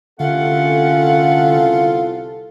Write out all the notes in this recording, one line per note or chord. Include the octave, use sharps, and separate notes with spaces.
C2 D3 A3 C#4 F4 A4 F#5